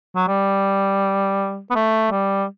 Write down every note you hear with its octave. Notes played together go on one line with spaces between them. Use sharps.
F#3
G3
B3
A3
G3